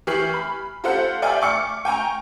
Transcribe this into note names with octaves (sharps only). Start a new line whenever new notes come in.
E3 G4 C#6 F6 C7 F#7
B5
F4 G4 A4 C5 F5 F#5
D5 E5 F5 G5 G#5 F6
C#6 D6 C#7
G5 G#5 A#5 C#6